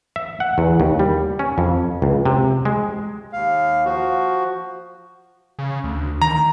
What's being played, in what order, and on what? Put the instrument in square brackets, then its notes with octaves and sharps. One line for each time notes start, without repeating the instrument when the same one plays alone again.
[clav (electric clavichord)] E5
F#5
E2
D#2
G3
C#4
F2
C#2
C3
G#3
[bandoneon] D#2 F5
F3 F#4
[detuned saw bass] C#3
D2
[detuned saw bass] D#3 [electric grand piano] A#5